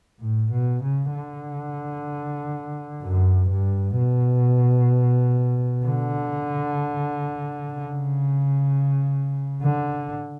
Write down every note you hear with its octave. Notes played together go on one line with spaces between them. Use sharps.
A2
B2
C#3
D3
F#2
G2
B2
D3
C#3
D3